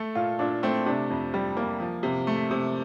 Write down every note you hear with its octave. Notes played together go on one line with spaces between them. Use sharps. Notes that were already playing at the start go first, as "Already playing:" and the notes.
Already playing: A3 A4
A#2 F4
A#2 D4
A3 C4
C3 D4
F2
G3
A#3
F3
C3
A3
C3